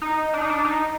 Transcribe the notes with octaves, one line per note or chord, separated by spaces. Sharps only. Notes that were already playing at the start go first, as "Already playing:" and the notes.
D#4
D4
D#4
D4
D#4